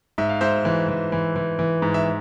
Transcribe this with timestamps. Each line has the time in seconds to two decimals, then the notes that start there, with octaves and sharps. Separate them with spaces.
0.18 G#2 E5
0.29 F5
0.41 G#2 C5 E5
0.65 E3
0.88 E3
1.12 E3
1.36 E3
1.59 E3
1.82 G#2
1.94 E5